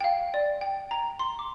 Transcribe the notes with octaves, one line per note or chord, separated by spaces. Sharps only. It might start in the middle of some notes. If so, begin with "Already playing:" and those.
G5
F5
D5
G5
A#5
C6
D6